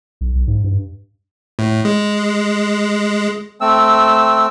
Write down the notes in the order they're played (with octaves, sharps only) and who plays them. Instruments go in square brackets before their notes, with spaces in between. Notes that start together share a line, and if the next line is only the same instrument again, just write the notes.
[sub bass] B1
B1
G#2
G2
[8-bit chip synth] A2
G#3
[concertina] A3 C4 E6